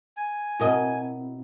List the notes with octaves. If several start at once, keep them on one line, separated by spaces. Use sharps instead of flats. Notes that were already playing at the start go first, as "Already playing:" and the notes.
G#5
B2 C4 E4 A#4 D#5